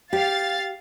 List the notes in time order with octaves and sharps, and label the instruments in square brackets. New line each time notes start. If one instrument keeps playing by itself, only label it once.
[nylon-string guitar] G4 [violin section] F5 A6